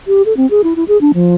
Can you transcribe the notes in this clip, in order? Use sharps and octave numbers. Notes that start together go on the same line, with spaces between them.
G4
A4
C4
G#4
E4
E4
G#4
D4
F3